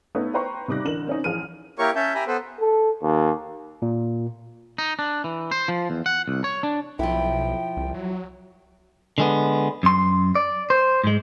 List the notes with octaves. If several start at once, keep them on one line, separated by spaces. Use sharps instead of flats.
A3 B3 D#4 B4 C#5
B4 C5 G5 A#5 C6 C#6
C3 G3 D#4 D6 F#6 A#6
A1 D3 A#4 E7 F#7
C4 C#4 D#4
A1 F3 G#4 F6 D#7
A#3 E4 G4 A#4 C#5 C#6
C#4 C#5 E5 A5 G6
G4 E5 G#5 A#5 B5
B3 A4 B4 C5
A4
D#2
A#2
D#4
D4
E3
C5
F3
E2
F#5
C2
C#5
D4
B1 F3 E4 G5
C2
F#3
D3 G#3 B3
F#2 C6
D5
C5
G#2 G#3